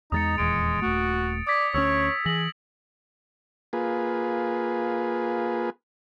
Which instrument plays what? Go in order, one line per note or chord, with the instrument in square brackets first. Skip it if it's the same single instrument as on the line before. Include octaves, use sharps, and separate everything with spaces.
[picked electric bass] E2 G3 G#3 [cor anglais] D#4 [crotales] D#6 A6 C#7
[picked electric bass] D#1 E2 [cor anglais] G#3 [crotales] D7
[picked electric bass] D#1 A3 [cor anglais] F#4
[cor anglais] D5 [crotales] D#6 G#6 B6
[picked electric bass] D2 C#4 [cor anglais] C#5 [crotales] E6
[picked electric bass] E3 [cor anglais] G#4 [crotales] A#6 F#7
[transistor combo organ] A#3 F4 G#4 B4